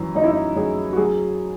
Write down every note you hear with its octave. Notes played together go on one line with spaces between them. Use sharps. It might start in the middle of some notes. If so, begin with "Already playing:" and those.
Already playing: F#2 E3
F#2 D#4
E4
D#4
F#2 G#4
F#4
F#3 G#4